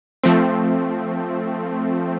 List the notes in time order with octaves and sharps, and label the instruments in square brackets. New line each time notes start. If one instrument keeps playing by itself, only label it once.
[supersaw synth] F3 A3 C4